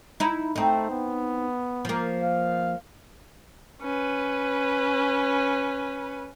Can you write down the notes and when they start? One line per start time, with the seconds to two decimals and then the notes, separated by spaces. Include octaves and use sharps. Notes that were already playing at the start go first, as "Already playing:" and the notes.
0.20 D#4 E4
0.56 A3 C4 D#4
0.90 B3
1.85 F3 A#3
2.24 F5
3.81 C#4 B4